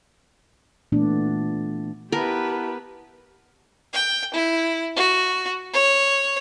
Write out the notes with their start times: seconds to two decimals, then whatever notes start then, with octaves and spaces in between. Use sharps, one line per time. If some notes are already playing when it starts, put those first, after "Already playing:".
0.92 A#2 E3 A3 B3 D4
2.12 B3 E4 G4 A#4 B4 A5
3.93 G5
4.34 E4
4.96 F#4
5.73 C#5